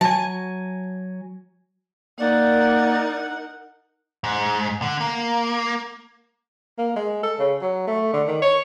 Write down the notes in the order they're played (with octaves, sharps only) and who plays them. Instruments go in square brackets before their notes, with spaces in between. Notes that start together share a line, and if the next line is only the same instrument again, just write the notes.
[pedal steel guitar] F#3 G#5 [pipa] A5
[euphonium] A#3 [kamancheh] D#4 A#4 [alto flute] D5 [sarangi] F#5
[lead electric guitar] G#2
D3
A#3
[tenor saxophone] A#3
G#3
A4
C#3
F#3
A3
D3
D#3
C#5